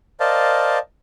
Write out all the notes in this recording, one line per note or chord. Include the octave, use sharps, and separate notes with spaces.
A#4 C5 D5 D#5 F5 A5